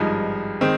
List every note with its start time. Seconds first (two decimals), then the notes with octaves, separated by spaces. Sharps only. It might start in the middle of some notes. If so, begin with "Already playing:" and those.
Already playing: G#1 G2 F3 G#3 D#4
0.61 D#3 G#3 C4